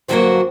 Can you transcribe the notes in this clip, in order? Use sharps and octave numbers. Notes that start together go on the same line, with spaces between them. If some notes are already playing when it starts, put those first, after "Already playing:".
G2 D3 F#3 A#3 C4 F#4